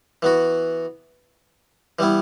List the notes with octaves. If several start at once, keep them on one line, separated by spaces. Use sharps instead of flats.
E3 B3 F#4
E3 G3 B3 E4